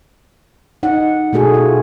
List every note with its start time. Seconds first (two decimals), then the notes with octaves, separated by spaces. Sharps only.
0.83 D#4 F#5
1.33 B2 A3 F#4 G#4 A4
1.54 F4